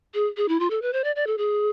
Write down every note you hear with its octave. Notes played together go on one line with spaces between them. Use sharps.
G#4
G#4
E4
F4
A4
B4
C5
D5
D5
A4
G#4